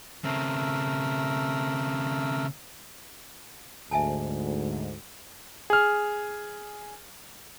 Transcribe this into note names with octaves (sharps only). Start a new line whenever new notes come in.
C#3 A3 C4 A#4 E6
D2 G#2 E5 G#5 A5
G#4 F6